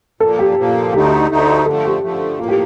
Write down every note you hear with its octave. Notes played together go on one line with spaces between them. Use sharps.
A#2 F3 A#3 A4
G4
A#2 F3 A#3
D2 D3 A3 D#4 G4
D2 D3 A3 D#4
D3 F3 A3 A4
G4
D3 F3 A3
A2 F3 A#3 F4
G4